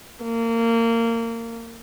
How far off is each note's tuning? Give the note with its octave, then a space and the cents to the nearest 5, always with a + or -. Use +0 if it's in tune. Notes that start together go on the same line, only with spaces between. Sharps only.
A#3 -25